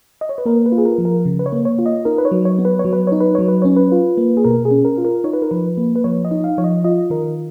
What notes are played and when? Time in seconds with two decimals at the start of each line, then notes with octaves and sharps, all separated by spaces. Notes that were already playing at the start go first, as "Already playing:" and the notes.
0.21 D#5
0.29 C#5
0.38 B4
0.46 A#3 A#4
0.66 B4
0.72 F4
0.78 G#4
0.85 A#4
0.98 F3
1.05 A#4
1.25 C#3
1.39 B4
1.46 C#5
1.52 A#3
1.65 C#5
1.79 F4
1.86 D#5
2.05 D#4 A#4
2.18 B4
2.25 C#5
2.32 F#3
2.45 C#5
2.59 B3
2.65 B4
2.79 C#5
2.85 F#3
2.93 B4
3.07 D#4 C#5
3.20 B4
3.35 F#3 C#5
3.48 B4
3.62 C#4 C#5
3.77 B4
3.92 F4
4.18 A#3
4.37 G#4
4.45 B2 A#4
4.65 G#4
4.71 C#4
4.85 A#4
4.98 F4
5.05 A#4
5.24 D#4 C#5
5.33 B4
5.42 A#4
5.51 F3 B4
5.77 A#3
5.96 B4
6.04 F3 C#5
6.25 D#5
6.31 D#4
6.44 F5
6.58 F3 C#5
6.64 D#5
6.84 F4 D#5
7.10 D#3 A#4